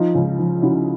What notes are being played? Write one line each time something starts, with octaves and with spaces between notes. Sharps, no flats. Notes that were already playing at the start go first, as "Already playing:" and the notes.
Already playing: F3 D#4 F4
C#2
F3
C#3 E4 F#4